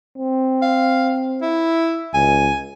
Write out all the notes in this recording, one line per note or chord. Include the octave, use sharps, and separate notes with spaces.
C4
F5
E4
C#2 G#5